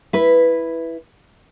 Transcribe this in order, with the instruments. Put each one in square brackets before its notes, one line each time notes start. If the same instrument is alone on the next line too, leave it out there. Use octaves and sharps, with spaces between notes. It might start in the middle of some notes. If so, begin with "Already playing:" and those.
[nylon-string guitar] E4 B4